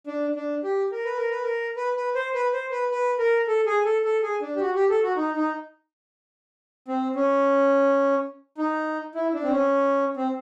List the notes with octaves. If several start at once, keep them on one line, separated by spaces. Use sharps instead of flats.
D4
D4
G4
A#4
B4
A#4
B4
A#4
B4
B4
C5
B4
C5
B4
B4
A#4
A4
G#4
A4
A4
G#4
D4
G4
F#4
G4
A4
F#4
D#4
D#4
C4
C#4
D#4
E4
D4
C4
C#4
C4